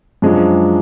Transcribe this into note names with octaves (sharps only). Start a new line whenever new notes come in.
F#2 F3 G#3 D4